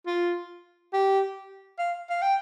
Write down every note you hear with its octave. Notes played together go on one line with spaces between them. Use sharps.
F4
G4
F5
F5
G5